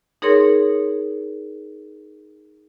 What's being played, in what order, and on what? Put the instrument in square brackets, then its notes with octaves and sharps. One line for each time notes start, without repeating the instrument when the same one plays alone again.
[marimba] D#4 G#4 A#4 C#5 C6